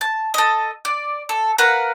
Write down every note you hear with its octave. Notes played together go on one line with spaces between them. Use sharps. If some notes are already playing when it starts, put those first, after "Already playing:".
A5
A4 D#5
D5
A4
A#4 B4 F5 F#5